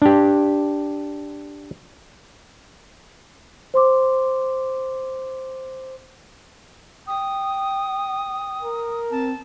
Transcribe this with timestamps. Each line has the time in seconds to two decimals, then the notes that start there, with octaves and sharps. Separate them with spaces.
0.02 D4 G4
3.74 C5 C6 D6
7.07 G5 D#6
8.63 A#4
9.11 C4 A5